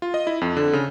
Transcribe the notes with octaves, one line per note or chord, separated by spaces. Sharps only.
F4
D#5
E4
F2
D3
C#3